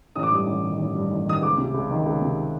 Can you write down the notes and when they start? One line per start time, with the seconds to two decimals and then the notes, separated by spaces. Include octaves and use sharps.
0.15 A1 D#6
0.23 D6
0.32 G2 D#6
0.47 A1
0.64 D#3
0.79 A1
0.95 G2
1.11 A1
1.26 D#3 D#6
1.42 C#2 D6
1.58 C3
1.74 C#2
1.90 D#3
2.06 C#2
2.22 C3